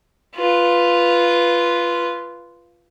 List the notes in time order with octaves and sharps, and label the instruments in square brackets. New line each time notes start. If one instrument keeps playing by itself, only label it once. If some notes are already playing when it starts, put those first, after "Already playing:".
[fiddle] F4 B4